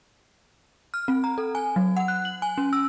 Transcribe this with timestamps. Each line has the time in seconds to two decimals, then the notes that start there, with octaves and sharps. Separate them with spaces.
0.94 F6
1.08 C4
1.24 A#5
1.38 A4
1.55 G#5
1.76 F#3
1.97 F#5
2.08 F#6
2.25 F#7
2.42 G#5
2.58 C#4
2.73 E6